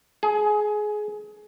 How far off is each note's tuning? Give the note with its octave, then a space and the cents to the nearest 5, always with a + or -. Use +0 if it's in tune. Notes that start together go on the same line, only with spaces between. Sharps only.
G#4 +20